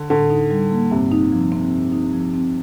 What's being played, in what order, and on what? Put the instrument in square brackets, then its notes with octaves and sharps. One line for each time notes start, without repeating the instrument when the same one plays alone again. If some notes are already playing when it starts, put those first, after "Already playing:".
Already playing: [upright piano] D3
[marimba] A2 [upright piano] D3
[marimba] D#4
G3
A#3
[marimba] G2 [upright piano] C3
[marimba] D#4
F3
C4
G2
D#4
F3
C4